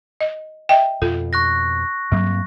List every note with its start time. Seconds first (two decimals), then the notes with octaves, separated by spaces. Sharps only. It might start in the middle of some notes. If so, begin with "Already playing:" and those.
0.21 D#5
0.69 D#5 E5 G5
1.02 F2 B2 F4 A4
1.33 C#6 F#6 A#6
2.12 G2 F#3 A#3 C4